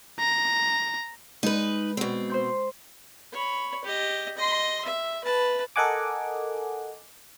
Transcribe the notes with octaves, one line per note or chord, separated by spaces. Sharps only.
A#5
G#3 D#4 B4
B2 C4
C5 C6 G6
C#5 B5
G4 D#5
D#5 C6
E5
B4 A5
A4 A#4 D#5 F#5 G#5 D6